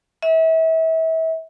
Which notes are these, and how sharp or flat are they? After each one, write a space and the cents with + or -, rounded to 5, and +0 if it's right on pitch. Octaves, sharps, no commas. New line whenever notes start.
E5 -30